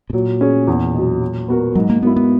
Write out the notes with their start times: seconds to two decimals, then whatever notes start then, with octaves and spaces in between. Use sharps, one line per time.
0.10 B2
0.13 A#2 F#3
0.41 C#4 G#4
0.67 E2
0.94 B2 F#3
1.21 F#3
1.48 B3 F#4 A#4
1.75 G#2 F#3
1.90 A#3
2.03 F#3 A#3 B3 E4
2.16 B3